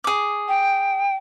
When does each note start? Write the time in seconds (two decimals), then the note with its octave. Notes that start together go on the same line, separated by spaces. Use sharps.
0.04 G#4 D6
0.48 G5